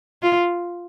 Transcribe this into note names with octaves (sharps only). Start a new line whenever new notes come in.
F4